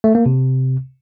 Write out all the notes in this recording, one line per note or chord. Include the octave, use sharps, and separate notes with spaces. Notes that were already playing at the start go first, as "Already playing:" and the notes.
A3
A#3
C3